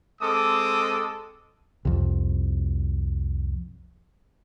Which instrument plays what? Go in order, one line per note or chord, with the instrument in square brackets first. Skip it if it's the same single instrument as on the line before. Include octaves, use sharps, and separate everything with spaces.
[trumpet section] G#3 C4 A4 D6 D#6
[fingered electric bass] C2 F2